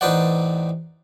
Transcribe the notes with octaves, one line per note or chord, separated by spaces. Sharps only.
A1 D#4 B4 C5 D5 F#5